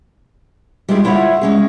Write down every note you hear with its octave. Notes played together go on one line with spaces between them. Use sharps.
G3 G#3 D4 E4 F4 G#4
D2 E4 F4 C#5 E5 F#5
G#3 C#4 G#4